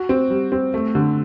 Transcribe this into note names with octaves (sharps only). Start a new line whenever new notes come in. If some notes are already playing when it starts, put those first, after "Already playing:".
Already playing: F#4
C4
G3
C4
A3
D3